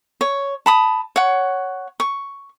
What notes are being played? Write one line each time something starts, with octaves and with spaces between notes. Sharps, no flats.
C#5
A5 B5 D#6
C#5 F#5
C#6